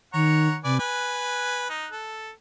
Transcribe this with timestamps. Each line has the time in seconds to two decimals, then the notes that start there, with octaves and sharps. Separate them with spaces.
0.14 D#3 C#5 F#5 A#5
0.64 C3 B4 D5 G#5
0.79 B4 G#5 F#6
1.70 D#4
1.91 A4